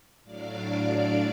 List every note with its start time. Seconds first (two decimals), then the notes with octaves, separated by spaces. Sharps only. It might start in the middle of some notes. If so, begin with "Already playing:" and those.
0.24 A2 F#3 D4 D5 F5 D6